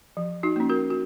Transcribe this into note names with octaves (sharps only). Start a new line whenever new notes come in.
F3
D#4 F#4
A#3 C#4
F#4 A#4
F#4